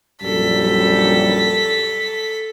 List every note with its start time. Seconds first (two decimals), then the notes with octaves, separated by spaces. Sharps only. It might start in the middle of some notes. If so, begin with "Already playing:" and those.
0.22 A#1 F#2 G3 A4 B6